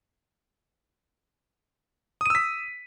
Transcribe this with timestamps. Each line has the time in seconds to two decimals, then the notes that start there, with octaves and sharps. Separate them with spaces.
2.21 D#6
2.26 D#7
2.30 E6
2.35 B6